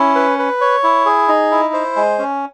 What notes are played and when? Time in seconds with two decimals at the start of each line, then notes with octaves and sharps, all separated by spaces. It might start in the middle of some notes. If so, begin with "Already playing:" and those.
Already playing: C#4 E4
0.15 B4
0.39 B4
0.61 C#5
0.84 E4
1.06 G#4
1.28 D#4
1.51 E4
1.73 C5
1.96 G#3
2.19 C#4